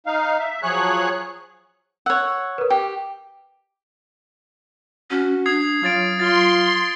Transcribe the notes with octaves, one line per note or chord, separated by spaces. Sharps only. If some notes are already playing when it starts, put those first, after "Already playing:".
D#4 F5
E5
F3 F#3 G#4 C#5 F#6
C#5 F#5 E6
A#4 B4
G4 G5
C#4 F#4
D4 D#6 G#6 C7
F#3 C#4 F4 D#6 A6 D7
F4 C6 A6